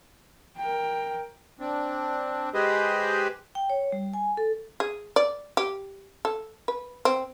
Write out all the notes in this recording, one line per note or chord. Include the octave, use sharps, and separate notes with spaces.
A#4 G5
C4 D4
G#3 G4 G#4 B4 C5 D#5
G5
C#5
G3
G#5
A4
G#4
D5
G4
A4
B4
C4